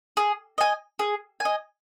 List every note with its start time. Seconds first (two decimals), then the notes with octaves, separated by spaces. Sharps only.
0.17 G#4
0.58 D#5 G#5
0.99 G#4
1.40 G#5
1.45 D#5